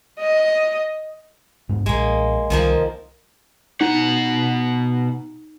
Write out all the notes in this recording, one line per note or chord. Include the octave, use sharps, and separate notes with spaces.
D#5
G#2 B3 D4
B1 A#2 G#3 A#3
C2 D#3 F3 A#3
B2 D#4 F#5